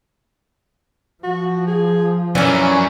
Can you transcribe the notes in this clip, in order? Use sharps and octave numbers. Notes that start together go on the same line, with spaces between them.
F3 F#4
G#4
F#2 E3 C#4 D5